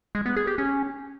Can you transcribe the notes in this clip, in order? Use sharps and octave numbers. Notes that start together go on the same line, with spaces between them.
G#3
B3
G#4
G4
C#4